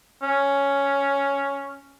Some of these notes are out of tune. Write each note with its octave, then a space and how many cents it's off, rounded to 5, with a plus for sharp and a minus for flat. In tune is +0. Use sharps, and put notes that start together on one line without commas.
C#4 +5